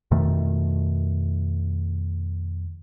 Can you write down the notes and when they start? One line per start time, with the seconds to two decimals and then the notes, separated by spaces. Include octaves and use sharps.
0.11 F2 B2 D#3 A3